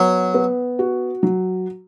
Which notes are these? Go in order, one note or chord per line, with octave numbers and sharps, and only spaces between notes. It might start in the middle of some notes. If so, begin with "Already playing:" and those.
Already playing: F#3 B3
B3
F#4
F#3